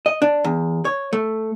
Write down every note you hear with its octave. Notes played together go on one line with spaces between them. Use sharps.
D#5
D4
E2
C#5
A3